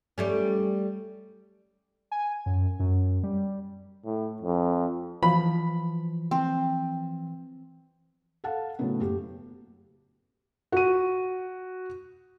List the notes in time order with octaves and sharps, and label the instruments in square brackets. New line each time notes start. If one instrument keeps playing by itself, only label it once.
[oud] G3 A3 C#4
[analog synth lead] G#5
F#2
F#2
G3
[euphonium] A2
F2
[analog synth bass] E3 [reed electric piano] F3 [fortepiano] B5
[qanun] C4
[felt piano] A4 F5 F#5 A5
A2 C#3 F#3 A3 B3
F#1 G4
F#4 D#7